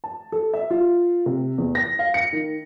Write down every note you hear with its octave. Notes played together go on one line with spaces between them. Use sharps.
A5
A4
E5
F4
C3
E2
A#6
F5
C#7
D#3